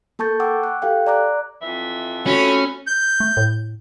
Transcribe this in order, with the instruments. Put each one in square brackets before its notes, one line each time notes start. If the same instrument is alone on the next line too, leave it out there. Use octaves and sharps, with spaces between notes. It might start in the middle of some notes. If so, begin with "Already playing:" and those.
[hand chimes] A#3 A4 A5 C#6 G6 A6
F#5 G5 C#6 D6 E6
F#6
G4 A4 F5 G5
D5 A#5 D6 F#6
[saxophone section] F2 E3 E5
[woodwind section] A3 F#4 [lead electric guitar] C#4 [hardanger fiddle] B5
[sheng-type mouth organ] G6
[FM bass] A3
A2